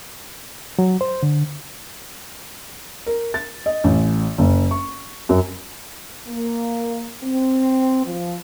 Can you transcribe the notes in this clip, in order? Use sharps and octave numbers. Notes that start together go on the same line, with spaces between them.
F#3
C5
D3
A#4
A6
D#5
A1
F#1
C#6
F#2
A#3
C4
F3